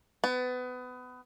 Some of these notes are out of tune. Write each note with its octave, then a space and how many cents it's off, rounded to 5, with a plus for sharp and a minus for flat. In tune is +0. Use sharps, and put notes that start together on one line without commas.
B3 +25